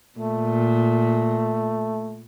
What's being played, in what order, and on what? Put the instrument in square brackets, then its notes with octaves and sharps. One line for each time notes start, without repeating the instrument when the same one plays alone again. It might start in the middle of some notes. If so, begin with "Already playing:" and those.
[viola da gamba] A#2 [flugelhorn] A3